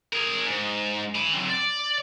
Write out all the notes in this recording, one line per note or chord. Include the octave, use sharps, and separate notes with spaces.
G#4 A#4
G#2
G#5 B5
F#3 C4
D5